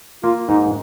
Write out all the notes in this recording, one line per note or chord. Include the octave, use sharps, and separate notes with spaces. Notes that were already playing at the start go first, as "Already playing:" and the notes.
A#3 F4
G#2 D#4